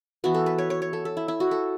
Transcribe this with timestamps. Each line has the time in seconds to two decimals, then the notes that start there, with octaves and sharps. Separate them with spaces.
0.24 E3 B3 F#4
0.34 A4
0.46 B4
0.58 C#5
0.70 C#5
0.82 C#5
0.93 A4
1.05 A4
1.17 E4
1.28 E4
1.40 F#4
1.51 A4